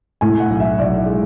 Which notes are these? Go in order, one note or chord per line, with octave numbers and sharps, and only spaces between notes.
A2 G#5
F#5
B1
E5
B1 D5
E5
G#3